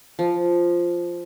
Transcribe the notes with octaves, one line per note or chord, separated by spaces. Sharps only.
F3